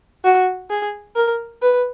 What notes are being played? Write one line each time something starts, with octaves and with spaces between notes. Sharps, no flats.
F#4
G#4
A#4
B4